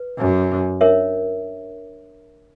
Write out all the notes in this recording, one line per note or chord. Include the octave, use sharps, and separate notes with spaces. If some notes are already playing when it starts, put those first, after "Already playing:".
Already playing: B4
F#2
D4 A#4 C#5 E5